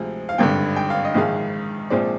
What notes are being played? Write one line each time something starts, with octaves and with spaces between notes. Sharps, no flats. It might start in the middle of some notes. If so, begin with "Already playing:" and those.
Already playing: D2 C3 F3 G#3
F5
G#1 G2 D3 G5
G5
F5
D#5
A#1 G#2 D#3 G#3 F5
A#1 A#2 F3 G#3 C4 D5